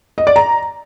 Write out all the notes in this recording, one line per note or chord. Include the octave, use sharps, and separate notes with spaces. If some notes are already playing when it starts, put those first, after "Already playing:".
D#5
D5
A#5